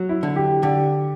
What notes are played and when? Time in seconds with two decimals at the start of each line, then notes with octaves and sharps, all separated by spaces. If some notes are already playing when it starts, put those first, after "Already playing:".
Already playing: F#3
0.09 E4
0.23 D3
0.36 G4
0.63 D3 G4